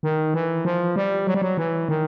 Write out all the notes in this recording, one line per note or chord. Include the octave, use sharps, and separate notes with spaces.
D#3
E3
F3
G3
F#3
G3
F#3
E3
D#3